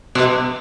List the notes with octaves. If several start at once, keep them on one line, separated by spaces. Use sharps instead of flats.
B2